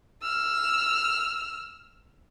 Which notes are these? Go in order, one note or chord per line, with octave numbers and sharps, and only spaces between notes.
E6 F6